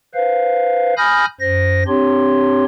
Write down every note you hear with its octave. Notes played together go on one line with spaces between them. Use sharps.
B4 C5 F5
G#5 B5 D#6 F6 G6 A#6
F#2 C5 A#6
C4 D4 G4 C#5 C6